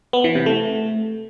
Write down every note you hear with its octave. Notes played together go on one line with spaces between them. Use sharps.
B3
E3
C3
A3